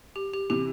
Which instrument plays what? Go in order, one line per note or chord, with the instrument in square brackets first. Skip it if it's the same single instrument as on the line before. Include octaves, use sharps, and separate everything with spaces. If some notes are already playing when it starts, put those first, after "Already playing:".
[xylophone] G4
G4
[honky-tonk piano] C3 E3 [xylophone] G4